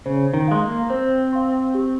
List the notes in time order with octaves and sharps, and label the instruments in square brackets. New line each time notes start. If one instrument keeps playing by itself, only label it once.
[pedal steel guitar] C#3 [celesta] C5
[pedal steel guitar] D#3
[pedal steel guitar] G#3 [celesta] F5 C6
[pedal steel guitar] A#3
[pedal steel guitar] C4 [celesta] C5
[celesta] F5 C6
G4